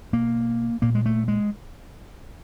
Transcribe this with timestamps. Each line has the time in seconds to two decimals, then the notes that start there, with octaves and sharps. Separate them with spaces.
0.13 B2 A#3
0.82 A#2 A#3
0.95 G#3
1.06 A3
1.28 G#3